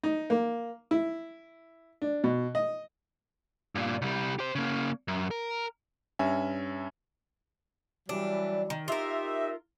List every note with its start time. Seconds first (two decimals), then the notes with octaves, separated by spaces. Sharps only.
0.03 D#4
0.30 A#3
0.91 E4
2.02 D4
2.24 B2
2.55 D#5
3.75 G2 A#2
4.02 C2 G3
4.39 G4 C5
4.55 C#3 A#3
5.08 F#2
5.31 A#4
6.19 G2 C#4 E5 G#5
8.09 E3 F#3 G3 D4
8.70 D#3
8.88 D#4 F4 G4 A#4 E5